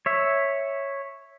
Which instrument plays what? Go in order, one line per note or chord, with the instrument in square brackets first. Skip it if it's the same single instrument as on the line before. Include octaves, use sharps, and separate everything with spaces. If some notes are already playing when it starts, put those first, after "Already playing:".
[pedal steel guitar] C#5 E5